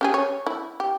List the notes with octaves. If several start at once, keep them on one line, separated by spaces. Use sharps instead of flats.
C#4 G4 G#4
C#5
E4
G4